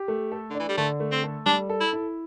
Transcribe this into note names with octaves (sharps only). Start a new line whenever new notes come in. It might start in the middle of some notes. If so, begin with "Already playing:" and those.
Already playing: G4
A3
A4
D3
D4
E3
G3
D3 A3
A3
C4
A4
G3 D4
A4
E4
E4